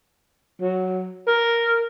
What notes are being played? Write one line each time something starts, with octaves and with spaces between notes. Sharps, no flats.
F#3
A#4